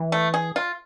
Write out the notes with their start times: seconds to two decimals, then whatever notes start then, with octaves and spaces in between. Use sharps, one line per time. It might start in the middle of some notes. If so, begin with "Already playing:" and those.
Already playing: E3
0.12 A3
0.34 G#4
0.56 F4